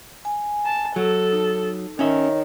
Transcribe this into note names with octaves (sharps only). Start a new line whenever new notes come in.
G#5
A5
F#3 A4
D#4
D#3 C#4 D#4 C#5 E5